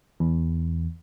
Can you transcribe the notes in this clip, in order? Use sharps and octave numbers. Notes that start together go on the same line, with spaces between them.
E2